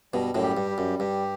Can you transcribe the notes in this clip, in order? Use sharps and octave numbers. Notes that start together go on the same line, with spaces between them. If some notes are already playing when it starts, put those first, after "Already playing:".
G2 B2 G3
F#2 A2
G4
G2
G3
F#2
G2 G4